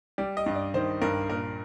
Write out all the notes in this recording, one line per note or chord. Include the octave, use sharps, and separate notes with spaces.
G3 D5
D#5
G2
D5
D#3 C5
G2 A#4
A#2 A#4